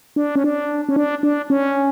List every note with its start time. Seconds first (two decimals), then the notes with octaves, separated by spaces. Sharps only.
0.16 D4
0.35 C#4
0.44 D4
0.89 C#4
0.96 D4
1.23 D4
1.50 C#4